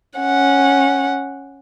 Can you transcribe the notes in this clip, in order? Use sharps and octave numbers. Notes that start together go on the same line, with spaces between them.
C#4 F#5